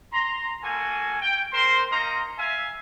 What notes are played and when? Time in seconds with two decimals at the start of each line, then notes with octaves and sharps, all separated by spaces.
0.13 A#5 C6
0.63 A#3 F#4 A4 G#5
1.22 G5
1.53 A#4 C5 C6
1.91 A#3 D#4 A#4 D#5 A#5 C6
2.38 E5 F5 G#5